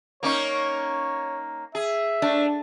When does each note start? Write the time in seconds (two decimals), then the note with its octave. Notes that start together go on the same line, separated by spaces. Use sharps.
0.23 A#3 C#4 D#4 C#5
1.75 G#4 E5
2.22 A3 D4